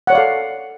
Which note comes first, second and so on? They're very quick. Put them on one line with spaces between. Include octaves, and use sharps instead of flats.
F#5 C#5 D5 F5 A4